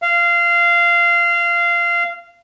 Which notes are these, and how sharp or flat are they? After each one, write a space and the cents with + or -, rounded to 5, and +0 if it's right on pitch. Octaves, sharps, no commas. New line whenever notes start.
F5 -20